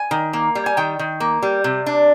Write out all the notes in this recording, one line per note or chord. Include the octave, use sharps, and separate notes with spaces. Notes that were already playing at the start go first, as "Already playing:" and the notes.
Already playing: G#5
D#3
A#3
G3
G#5
D#3 G5
D#3
A#3
G3
C3
D4